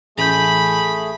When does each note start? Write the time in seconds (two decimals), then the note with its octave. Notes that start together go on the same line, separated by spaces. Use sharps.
0.18 A1 A3 G#4 B5 G6